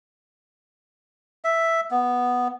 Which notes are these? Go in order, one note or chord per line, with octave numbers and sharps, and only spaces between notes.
E5
B3